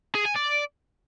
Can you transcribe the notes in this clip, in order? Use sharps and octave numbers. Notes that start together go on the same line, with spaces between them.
G#4
G#5
D5